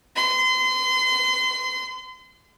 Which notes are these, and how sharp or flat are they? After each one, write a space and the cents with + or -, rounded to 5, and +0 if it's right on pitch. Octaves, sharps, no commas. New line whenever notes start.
C6 -35